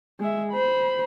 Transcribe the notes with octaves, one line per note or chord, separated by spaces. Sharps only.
G#3 E5
C5 B5